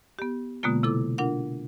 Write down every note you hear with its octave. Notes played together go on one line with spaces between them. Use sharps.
B3 G4
B2 D3 G#3 A#3 B3 F4
C3 E4 A4 D6
D4 F4 A#4 F#5